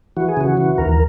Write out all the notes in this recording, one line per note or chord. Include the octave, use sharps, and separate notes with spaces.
E3 F#4
G#4
C#3 F#4
E3
D#2 A#4